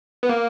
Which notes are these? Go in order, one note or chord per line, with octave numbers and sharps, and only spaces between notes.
B3
A#3